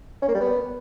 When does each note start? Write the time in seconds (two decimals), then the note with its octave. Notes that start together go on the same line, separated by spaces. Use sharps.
0.22 C#4
0.28 A#3
0.35 G3
0.41 B3